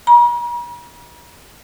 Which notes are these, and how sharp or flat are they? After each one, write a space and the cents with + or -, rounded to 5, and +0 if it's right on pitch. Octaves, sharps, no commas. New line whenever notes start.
A#5 +45